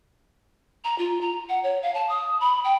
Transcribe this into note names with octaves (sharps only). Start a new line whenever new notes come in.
A#5
F4
A#5
F#5
C#5
F5
A5
D#6
B5
G5